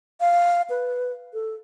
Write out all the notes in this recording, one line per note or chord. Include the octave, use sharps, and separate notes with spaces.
F5
B4
A4